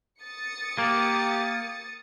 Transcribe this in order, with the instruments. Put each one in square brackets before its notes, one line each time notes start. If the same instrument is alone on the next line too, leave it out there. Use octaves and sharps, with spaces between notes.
[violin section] D#6 A6 C#7
[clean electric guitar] A#3 [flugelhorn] G4